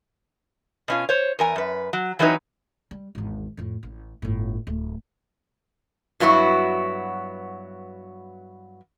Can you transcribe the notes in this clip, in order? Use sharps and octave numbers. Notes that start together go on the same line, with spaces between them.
B2 C#4 F4
C5 C#5
E2 A#4 G#5
F#2 B4
F#3
E3 F#3 A3 C4 D#4 B4
G3
G#1 E2
F2 A2
A1
G1 A2
D1 A3
G2 F#3 B3 E4 F#4